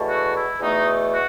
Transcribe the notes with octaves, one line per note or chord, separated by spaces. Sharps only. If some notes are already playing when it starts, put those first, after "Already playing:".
Already playing: E2 B2 A3
F#4
E4
E2 B2 A3 D#4
F#4